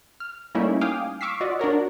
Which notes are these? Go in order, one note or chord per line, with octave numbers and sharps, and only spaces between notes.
F6
G3 A3 A#3 C#4 D#4 E4
F5 G5 G#5 D6 D#6 F6
C#6 D6 E6 F6 B6 C7
F4 F#4 D5 D#5
D4 F#4 A#4 C#5